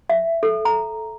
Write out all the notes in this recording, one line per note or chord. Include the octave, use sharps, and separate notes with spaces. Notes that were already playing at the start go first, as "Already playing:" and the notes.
E5
A4
A#5